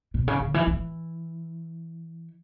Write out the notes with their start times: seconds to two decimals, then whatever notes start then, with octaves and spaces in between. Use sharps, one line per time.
0.14 B2
0.28 C#3
0.40 D3
0.54 E3
0.67 E3